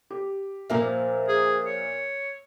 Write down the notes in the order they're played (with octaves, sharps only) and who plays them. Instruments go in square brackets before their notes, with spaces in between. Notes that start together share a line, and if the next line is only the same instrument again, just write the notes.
[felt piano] G4
[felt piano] A#2 A#4 E5 [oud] F3 A#3 C#4
[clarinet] G#4
C#5